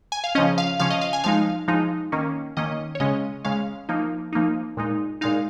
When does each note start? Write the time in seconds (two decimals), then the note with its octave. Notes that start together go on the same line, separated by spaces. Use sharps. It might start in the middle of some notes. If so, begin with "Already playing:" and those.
0.12 G#5
0.24 F5
0.35 C#3 F3 C#4 D#5
0.58 F5
0.79 C#3 F3 C#4 F5
0.90 D#5
1.01 F5
1.13 G#5
1.24 F3 G#3 D#4 F5
1.68 F3 G#3 D#4
2.12 D#3 A#3 C#4
2.57 D#3 A#3 C#4 D#5
2.95 C#5
3.00 C#3 G#3 C#4 D#5
3.45 C#3 G#3 C#4 F5
3.89 F3 A#3 D#4
4.33 F3 A#3 D#4
4.77 A#2 G#3 D#4
5.21 A#2 G#3 D#4 F5